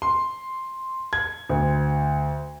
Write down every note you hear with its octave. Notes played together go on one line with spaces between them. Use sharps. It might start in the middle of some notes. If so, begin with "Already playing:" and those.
C6
G#6
D2